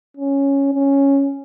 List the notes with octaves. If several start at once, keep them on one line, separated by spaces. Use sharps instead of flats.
C#4
C#4